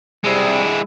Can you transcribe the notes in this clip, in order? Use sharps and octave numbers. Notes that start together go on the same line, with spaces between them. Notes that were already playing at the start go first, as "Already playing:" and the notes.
C3 G3 G#3 E4